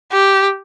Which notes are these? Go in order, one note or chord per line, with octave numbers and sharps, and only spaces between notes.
G4